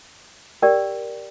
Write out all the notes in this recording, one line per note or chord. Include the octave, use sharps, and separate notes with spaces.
G4 A#4 D5 G5